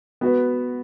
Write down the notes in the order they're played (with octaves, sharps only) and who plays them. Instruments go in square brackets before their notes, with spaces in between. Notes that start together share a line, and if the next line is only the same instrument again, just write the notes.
[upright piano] B3 F#4 B4